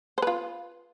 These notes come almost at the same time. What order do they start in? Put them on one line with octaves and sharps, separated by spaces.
C5 B4 F4